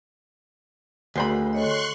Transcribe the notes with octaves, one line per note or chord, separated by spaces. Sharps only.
D2 F#4 G#4 A#4 C5 B5
A4 C#5 D#5 C6 C#6 F#6